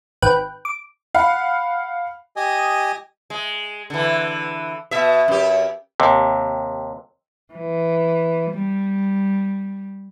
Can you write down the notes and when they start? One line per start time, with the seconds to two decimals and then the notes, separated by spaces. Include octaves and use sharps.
0.22 G#1 B4 G5 F#6
0.65 D6
1.15 F5 F#5 B5
2.36 G4 D#5 G#5 D#6
3.30 G#3
3.90 D3 E3
4.91 B2 E5
5.28 F#2 G4
6.00 D#2 C3
7.53 E3
8.50 G3